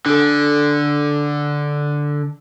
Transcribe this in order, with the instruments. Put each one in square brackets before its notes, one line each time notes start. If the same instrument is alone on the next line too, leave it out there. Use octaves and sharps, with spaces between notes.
[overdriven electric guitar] D3 [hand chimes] D4 A4